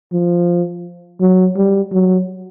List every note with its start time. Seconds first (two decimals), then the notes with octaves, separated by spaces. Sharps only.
0.13 F3
1.21 F#3
1.56 G3
1.92 F#3